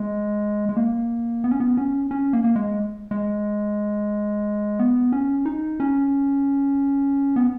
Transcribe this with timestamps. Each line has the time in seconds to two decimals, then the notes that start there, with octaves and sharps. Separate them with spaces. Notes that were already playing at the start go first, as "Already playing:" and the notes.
Already playing: G#3
0.69 G#3
0.77 A#3
1.44 B3
1.51 C#4
1.60 B3
1.77 C#4
2.11 C#4
2.33 A#3
2.44 A#3
2.56 G#3
3.11 G#3
4.79 B3
5.12 C#4
5.46 D#4
5.80 C#4
7.36 B3